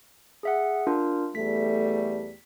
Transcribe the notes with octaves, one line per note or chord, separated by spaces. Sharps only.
G#4 E5 F#5
D4 F4 A#4
E2 G3 A3 B6